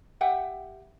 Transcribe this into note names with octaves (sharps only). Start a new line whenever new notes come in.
G4 E5 F#5 G5